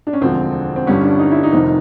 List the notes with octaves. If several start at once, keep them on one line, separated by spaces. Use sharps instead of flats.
D4
C#4
E1 D2 D3 F3 C4
C4
G1 G2 D3 G3 C#4
D4
D#4
E4
D#4
F1 F2 C3 D#3